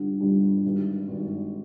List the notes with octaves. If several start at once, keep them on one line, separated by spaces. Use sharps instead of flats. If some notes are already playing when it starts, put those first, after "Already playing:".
Already playing: G1 G2 D3 G3 D4
G1 G2 D3 G3 D4
G#1 G2 D#3
G#1 G2 D#3